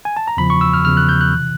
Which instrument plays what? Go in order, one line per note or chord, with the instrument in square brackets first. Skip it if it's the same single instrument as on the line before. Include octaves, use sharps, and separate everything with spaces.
[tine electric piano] G#5
A5
A#5
E2 C#3 F3 B5
C#6
E6
F6
E2 C#3 F3 F6
F#6
G6
F#6
C3 E3